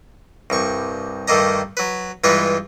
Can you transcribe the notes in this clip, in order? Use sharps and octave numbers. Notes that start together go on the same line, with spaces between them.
C2 G2 C#6
G2 D#3 A3 A#3 D#5 A#5
F#3 B4
G2 E3 G#3 F4 B4 C#6